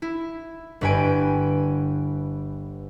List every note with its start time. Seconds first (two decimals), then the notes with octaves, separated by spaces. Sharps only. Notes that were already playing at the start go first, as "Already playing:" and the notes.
0.02 E4
0.81 G1 G2 B4 G5 G#5 D7